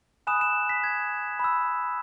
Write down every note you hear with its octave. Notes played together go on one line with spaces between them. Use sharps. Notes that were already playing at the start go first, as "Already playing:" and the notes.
G#5 B5 D#6 F#6 E7
E7
B6
G#6
B5 E6